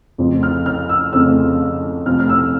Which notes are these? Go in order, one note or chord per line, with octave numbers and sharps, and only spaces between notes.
F2 C#3 F3 A3 C4
F6
F6
E6
F2 C#3 F3 A3 C4 E6
F2 C3 F3 A3 C4 F6
F6
E6